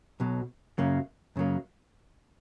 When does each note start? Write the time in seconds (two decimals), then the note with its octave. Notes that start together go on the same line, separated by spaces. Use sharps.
0.20 B1 B2 F#3
0.78 F#2 C#3 F#3 A#3
1.36 F#2 C#3 F#3 A#3